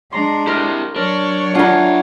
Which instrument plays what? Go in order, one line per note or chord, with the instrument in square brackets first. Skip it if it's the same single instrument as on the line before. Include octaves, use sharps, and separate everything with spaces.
[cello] G#3 D4 [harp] A#5 C6
[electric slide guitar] E4 G4 [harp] A#4
[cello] F#3 C#5 [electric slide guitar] D4 [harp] A#4
[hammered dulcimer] D4 A#5 [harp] F4 G#5 [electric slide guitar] E5 F#5